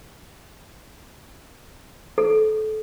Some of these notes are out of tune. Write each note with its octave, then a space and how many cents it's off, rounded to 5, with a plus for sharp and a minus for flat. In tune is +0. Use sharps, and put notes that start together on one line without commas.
A4 -25